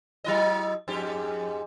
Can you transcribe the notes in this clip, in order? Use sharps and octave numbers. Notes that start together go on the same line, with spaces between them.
F#3 E4 D#5
F2 G#2 G4